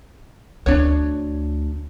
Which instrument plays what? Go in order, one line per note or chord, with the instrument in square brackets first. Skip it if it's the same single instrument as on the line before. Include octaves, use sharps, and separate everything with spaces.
[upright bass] D2 [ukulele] D4 C#5